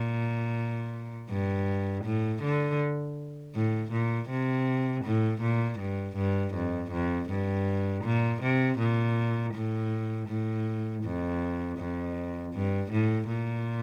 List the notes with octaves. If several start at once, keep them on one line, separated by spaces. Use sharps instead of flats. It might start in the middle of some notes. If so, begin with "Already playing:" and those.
Already playing: A#2
G2
A2
D3
A2
A#2
C3
A2
A#2
G2
G2
F2
F2
G2
A#2
C3
A#2
A2
A2
F2
F2
G2
A2
A#2